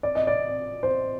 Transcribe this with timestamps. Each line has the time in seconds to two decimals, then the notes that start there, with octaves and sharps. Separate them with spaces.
0.03 D5
0.15 D#5
0.27 D5
0.83 C5